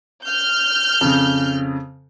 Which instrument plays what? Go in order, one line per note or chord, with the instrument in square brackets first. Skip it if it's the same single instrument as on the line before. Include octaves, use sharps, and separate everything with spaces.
[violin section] F6 G6
[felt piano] F2 C#3